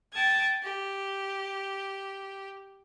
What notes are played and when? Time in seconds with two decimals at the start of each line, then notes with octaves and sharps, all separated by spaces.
0.12 G5 A5 D#6 G#6
0.62 G4